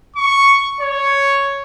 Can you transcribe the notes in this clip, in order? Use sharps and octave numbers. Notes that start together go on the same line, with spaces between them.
C#6
C#5